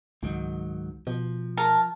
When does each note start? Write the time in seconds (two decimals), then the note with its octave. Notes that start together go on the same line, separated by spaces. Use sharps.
0.23 C#2 G#2 D#3 F#3
1.07 B2 F3
1.57 A#4 A5